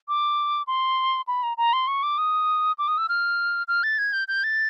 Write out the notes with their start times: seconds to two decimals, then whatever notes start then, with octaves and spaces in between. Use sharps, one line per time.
0.08 D6
0.67 C6
1.27 B5
1.43 A#5
1.57 A#5
1.73 C6
1.87 C#6
2.03 D6
2.18 D#6
2.78 D6
2.88 D#6
2.98 E6
3.09 F6
3.68 F6
3.83 A6
3.98 G#6
4.13 G6
4.28 G6
4.43 A6